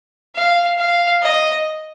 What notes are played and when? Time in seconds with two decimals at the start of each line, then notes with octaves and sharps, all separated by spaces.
0.35 F5
0.78 F5
1.22 D#5